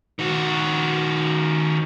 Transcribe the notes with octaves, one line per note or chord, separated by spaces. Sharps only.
D#3 F#4